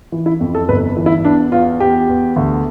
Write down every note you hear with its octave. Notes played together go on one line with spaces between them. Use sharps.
E3
E4
F2
A4
G1 B4
E3
E4
E2 D4
E2 F4
E2 G4
E2
D2